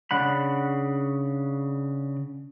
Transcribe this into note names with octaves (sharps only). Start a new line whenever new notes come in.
C#3 D4 F#5 B5